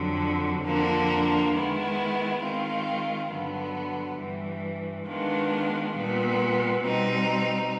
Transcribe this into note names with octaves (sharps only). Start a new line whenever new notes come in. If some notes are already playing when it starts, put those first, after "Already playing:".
Already playing: F2 D3 F#3
F2 D3 F3 A#3 D4
D#3 G#3 B3 E4
D#3 G#3 C4 F4
G2 D3 F#3 B3
G2 E3 G3
D#3 G#3 B3 D4 F4
A#2 G3 B3
B2 G3 C4 D#4